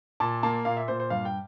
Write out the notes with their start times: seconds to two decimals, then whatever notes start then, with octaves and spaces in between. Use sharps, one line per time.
0.20 A#2 A5
0.43 A#3 A5
0.65 A#2 F5
0.77 E5
0.88 A#2 C5
1.00 C5
1.10 G2 F5
1.25 G5